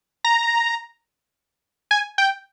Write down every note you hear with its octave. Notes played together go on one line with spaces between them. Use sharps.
A#5
G#5
G5